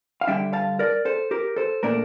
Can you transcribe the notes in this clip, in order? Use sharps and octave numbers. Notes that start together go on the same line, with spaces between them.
F5
D3 G3 D4 E5 G5
F5 A5
A#4 D5
A4 C5
G4 A#4
A4 C5
A#2 A3 D4 A#4 D5